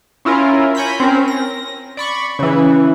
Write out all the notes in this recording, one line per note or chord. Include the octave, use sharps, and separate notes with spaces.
C#4 E4 F4 A#4
C#5 G#5 B5 G6 A#6 B6
C4 C#4 A#4
A#6
D5 B5 C#6
C#3 E3